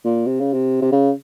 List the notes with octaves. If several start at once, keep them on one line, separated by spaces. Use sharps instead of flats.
A#2
C3
C#3
C3
C3
C#3